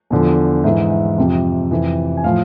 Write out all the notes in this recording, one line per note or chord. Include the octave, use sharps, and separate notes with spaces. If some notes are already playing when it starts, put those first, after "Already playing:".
E2 D3 F3
G#2 E3 E5
E5
F2 C3 F3
F2 C3 E3
G#5
A2 F3 F5